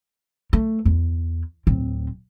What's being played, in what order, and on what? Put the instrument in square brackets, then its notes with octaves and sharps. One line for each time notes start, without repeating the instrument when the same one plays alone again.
[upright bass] A3
E2
D1 C4